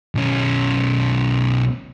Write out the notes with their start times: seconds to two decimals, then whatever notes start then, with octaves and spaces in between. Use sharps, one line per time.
0.15 B1 C#4